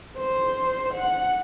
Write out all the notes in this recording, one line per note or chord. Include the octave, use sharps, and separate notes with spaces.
C5
F#5